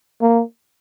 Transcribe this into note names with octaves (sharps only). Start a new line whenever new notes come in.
A#3